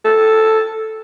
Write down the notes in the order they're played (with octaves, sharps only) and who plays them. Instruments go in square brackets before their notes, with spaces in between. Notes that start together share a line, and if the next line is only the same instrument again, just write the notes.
[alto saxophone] A4